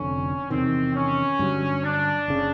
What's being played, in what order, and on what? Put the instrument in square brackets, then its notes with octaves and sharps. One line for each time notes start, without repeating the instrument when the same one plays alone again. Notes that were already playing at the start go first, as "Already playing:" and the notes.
Already playing: [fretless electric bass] F1 F2 D3 [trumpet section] C#4
[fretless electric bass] E2 C3 D#3 [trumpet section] C4
[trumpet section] C#4
[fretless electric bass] G2 D3 F#3
[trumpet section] D4
[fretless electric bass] F#1 C#3